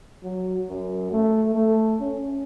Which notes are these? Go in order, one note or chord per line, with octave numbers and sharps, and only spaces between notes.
F#3
F#2
A3
A3
C#4